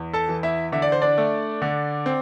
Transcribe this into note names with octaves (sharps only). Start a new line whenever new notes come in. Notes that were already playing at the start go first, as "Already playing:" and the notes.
Already playing: E2
A4 A5
E3
E4 E5
D3 E5
D5
C5
D4 D5
A3
D3
C4